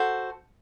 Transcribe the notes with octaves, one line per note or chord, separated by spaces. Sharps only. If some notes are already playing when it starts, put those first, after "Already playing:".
Already playing: F#4 A4 C5